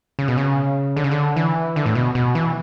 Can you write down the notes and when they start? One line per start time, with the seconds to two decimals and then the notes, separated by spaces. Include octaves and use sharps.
0.19 C#3
0.28 B2
0.38 C#3
0.96 D3
1.04 C#3
1.11 D3
1.36 E3
1.76 D3
1.86 A2
1.95 B2
2.15 B2
2.35 E3